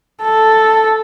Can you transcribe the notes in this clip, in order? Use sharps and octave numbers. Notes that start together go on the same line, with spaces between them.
A4